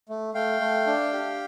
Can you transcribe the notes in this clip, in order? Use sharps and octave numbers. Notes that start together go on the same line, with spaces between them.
A3
A3 F5 G5
A3
D4
G4